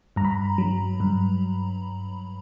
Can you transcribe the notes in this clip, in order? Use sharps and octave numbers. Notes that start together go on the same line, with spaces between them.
G2 A#5
B5
A#5
F#3
G2